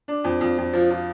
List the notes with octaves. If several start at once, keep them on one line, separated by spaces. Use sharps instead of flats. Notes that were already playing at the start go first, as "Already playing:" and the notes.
D4
F2
F2
F2
F3
F3